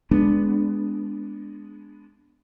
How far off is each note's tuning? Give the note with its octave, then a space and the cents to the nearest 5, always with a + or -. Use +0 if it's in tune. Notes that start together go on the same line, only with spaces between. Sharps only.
G#3 +0 B3 +5 D4 +0